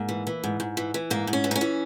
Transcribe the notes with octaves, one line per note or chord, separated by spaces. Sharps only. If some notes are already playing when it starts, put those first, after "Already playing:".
Already playing: G#2 A#3
E3
E3
G#2
G#2
E3
E3
G#2 A#3
G#2
C#4
E3
D#4
C#4
E3